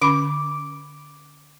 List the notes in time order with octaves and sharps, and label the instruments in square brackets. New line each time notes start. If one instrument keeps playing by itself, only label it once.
[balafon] D3 C#4 B5 [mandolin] D6